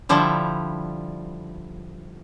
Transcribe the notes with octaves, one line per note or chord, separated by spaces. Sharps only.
D3 F3 G3 E4